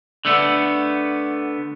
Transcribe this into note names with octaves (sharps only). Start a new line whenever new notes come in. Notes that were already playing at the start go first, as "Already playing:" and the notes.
D3 A3 B3